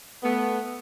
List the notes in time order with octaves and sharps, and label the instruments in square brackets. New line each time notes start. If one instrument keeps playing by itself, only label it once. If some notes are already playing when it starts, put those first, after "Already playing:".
[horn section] A3 B3